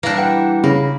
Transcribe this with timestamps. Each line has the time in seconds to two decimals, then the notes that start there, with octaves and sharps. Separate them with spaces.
0.03 E3 G3 A#3 D4
0.17 B4 F#5 G5
0.64 C#3 A#3 B5